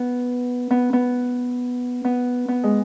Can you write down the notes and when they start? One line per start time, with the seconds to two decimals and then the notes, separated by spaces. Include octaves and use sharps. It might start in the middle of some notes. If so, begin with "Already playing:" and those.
Already playing: B3
0.71 B3
0.93 B3
2.05 B3
2.48 B3
2.64 G#3